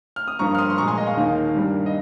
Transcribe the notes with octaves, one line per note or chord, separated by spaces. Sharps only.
F6
D#6
G2 F3 A#3 A#5 C#6
F6
C6 D#6
C6
A#2 G#3 A#5 C#6
G#5 C6
D#5
F5
D#2 D#3 A#3
G2 G3 A#3
D#5